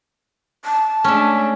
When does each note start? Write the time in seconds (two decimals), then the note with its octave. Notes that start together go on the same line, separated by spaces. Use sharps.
0.65 A5
1.04 G#3 A3 C#4 D4 E5